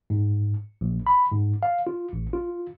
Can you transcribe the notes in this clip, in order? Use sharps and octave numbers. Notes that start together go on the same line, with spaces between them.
G#2
A#1
B5
G#2
F5
F4
A1
F4